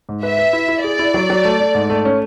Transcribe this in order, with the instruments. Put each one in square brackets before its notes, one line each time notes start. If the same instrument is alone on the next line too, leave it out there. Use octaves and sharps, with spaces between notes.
[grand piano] G#2
[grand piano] B4 [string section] E5
[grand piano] B4
E4
E4
[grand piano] G#4 [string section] D5
[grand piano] E4
F#3
F#3
A3
A3
G#2
A3
C#4